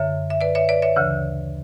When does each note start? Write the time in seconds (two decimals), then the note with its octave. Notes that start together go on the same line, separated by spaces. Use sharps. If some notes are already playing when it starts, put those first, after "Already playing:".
Already playing: F#2 D3 C#5 E5
0.30 E5
0.41 B4 D5
0.55 C#5 E5
0.69 B4 D5
0.82 C#5 E5
0.96 D2 C#3 E3